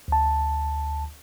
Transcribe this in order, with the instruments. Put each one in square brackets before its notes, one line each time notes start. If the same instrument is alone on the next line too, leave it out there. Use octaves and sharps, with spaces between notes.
[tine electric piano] D2 A5